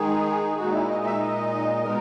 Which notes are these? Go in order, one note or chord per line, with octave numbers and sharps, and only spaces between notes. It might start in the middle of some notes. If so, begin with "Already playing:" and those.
Already playing: D#3 G#3 D#4 G#4
A#2 G#3 D#4 F#4
E4
D#5
E5
D#5
B2 G#3 B3 D#4 A#4